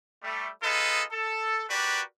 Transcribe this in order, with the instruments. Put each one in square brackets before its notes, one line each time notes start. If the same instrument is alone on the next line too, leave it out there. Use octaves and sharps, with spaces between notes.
[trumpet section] G3 A3
D#4 F4 G#4 A4 B4 D#5
A4
F#4 G4 A#4 B4 D5